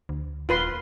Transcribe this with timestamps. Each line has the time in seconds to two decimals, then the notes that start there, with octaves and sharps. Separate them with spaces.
0.09 D2
0.49 D#1 F4 B4 C6